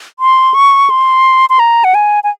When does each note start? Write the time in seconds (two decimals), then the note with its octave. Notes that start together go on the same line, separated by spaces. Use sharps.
0.20 C6
0.54 C#6
0.90 C6
1.50 C6
1.59 A#5
1.84 F#5
1.94 G#5
2.24 G#5